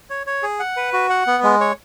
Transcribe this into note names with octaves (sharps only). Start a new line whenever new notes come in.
C#5
C#5
G#4
F#5
B4
F#4
F#5
B3
G#3
C#5